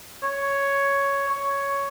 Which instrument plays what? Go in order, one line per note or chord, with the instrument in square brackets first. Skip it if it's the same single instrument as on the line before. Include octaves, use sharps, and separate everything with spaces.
[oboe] C#5
C#5